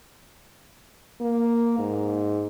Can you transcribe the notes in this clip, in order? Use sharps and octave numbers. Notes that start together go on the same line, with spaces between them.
A#3
G#2